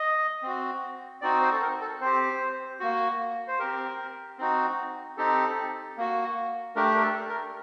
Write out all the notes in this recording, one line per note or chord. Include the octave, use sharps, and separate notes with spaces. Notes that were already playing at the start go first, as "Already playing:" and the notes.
Already playing: D#5
C4 F#4
C4 D#4 F#4 D5
C5
A4
A#4
A4
C4 G4 C5
A#3 F#4
C5
C4 G4 A#4
C4 D#4 F#4
C4 D#4 G4 A4
A#3 F#4
A3 D4 G4 A#4
A#4
A4
A#4